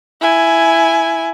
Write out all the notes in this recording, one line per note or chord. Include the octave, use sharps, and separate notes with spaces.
E4 G#5